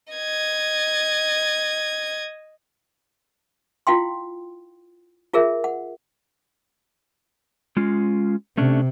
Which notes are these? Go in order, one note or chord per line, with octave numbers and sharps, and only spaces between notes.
D#5 G#6
E4 F4 F5 G5 C6
F4 G#4 A#4 E5
F#5
G#3 C#4 F4
C3 A3 C#4 D4